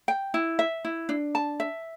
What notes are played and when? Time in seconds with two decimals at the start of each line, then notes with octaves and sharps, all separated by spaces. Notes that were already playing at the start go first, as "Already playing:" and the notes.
0.08 G5
0.34 E4
0.59 E5
0.85 E4
1.09 D4
1.35 A5
1.60 E5